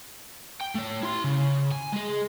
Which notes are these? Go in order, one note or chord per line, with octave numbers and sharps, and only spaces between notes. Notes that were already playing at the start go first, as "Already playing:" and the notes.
G5
A3 C#5
E4 C6
C#3
G#5
G#3 G#4